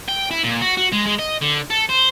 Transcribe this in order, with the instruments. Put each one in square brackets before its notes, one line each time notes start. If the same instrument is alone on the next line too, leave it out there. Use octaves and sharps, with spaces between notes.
[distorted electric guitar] G5
E4
A#2
F#4
F#4
G#3
G#3
D#5
D3
A4
C5